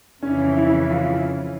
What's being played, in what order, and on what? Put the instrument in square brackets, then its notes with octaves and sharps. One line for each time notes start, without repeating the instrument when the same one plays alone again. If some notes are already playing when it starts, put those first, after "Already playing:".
[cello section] F2 C#3 E3 [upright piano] C#4
[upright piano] E4
F4